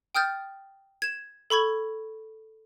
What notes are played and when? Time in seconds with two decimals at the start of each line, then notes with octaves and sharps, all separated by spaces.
0.15 G5 D#6 F6 G6 A6
1.02 G#6 E7
1.50 A4 B5 C#6 G#6